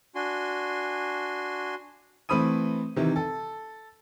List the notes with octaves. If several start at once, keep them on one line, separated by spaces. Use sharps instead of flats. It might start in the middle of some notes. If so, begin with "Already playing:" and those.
D4 F#4 G#5 C6
E3 A3 C4 B5 D#6 D#7
C3 D#3 E3
A4